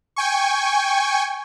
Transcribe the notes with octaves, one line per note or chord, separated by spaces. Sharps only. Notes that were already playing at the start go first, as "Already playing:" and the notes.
G5 G#5 C#6